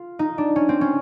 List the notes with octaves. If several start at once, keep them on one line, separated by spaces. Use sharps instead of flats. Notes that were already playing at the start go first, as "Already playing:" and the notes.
Already playing: F4
D#4
D4
C#4
C4
C#4